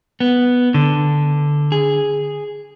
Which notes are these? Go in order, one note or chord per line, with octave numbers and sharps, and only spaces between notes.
B3
D3
G#4